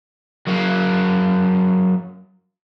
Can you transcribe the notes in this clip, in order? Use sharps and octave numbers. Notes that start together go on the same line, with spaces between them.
F#3 A#3